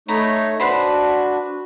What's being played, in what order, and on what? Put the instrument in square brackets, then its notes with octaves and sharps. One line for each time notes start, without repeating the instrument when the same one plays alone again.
[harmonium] A3 D#4 C#5 [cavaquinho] A#5 B5
[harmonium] D4 F#4 [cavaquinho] B4 C5 B5